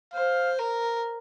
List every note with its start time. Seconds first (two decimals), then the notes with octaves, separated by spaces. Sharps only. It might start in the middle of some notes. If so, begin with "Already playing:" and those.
0.14 C5 F5
0.59 A#4